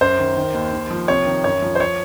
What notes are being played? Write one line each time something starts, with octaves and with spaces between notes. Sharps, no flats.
F#2 C5
D#3
D#3
D#2
D#2
F3
C3 C#5
D#3
F#2 C#5
F3
C5
C#5